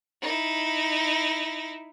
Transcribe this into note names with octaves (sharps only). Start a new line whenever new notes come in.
D#4 E4